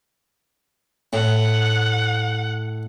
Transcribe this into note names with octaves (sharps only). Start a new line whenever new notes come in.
A2 F#5